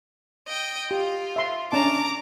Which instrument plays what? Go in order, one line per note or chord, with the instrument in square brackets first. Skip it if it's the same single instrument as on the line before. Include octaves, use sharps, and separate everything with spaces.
[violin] D#5 G5
[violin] F4 [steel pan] G4
[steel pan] E5 C6
[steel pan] C#4 D4 A5 [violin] A#5 D6